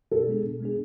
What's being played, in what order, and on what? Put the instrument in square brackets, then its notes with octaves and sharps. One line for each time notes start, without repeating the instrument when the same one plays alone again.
[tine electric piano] B2 [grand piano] A4
[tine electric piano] G#3 B3 D4 G#4
B2
G#3 B3 D4 G#4